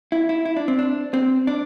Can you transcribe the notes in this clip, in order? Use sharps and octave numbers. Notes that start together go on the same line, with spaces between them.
E4
E4
E4
D4
C4
D4
C4
D4